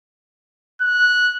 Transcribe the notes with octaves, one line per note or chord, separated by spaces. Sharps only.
F#6